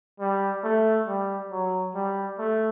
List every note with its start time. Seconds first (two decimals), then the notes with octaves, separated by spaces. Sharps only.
0.20 G3
0.64 A3
1.07 G3
1.51 F#3
1.95 G3
2.39 A3